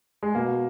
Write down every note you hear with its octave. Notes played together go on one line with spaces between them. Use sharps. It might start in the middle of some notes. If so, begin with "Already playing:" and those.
G#3
B2 A#3